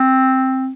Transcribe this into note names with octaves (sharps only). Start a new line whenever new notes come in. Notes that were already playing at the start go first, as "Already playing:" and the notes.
Already playing: C4